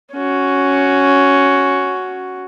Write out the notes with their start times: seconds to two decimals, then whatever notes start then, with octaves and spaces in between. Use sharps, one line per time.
0.14 C#4 F#4